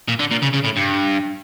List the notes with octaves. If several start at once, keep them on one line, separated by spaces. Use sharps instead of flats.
A#2
D3
A#2
C#3
C#3
A2
G2